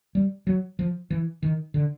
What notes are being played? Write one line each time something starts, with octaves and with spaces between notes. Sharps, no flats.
G3
F#3
F3
E3
D#3
D3